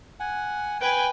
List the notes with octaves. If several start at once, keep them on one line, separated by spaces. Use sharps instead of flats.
F#5 G#5
B4 G5 G#5